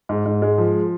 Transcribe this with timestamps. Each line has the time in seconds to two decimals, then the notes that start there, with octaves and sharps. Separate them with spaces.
0.09 G#2
0.26 G#2
0.42 G#3
0.58 F3